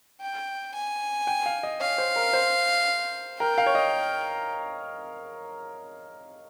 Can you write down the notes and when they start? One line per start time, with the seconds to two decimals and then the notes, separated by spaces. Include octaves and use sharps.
0.21 G5
0.74 G#5
1.27 G5
1.46 F5
1.63 D#5
1.81 C#5 F5
1.98 C5
2.16 A#4
2.33 C5
3.40 A#4 G5
3.58 F5
3.66 C#5
3.75 D#5